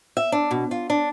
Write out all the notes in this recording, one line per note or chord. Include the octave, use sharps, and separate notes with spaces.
E5
D4
B2
F4
D4